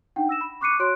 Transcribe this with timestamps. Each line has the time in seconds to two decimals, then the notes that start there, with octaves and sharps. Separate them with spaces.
0.16 D4 D#4 F#5 G5
0.29 E6 A#6 E7
0.41 B5
0.61 C#6 D6 F#6 C7 C#7 D#7
0.79 F#4 C#5 C6 F#6 D7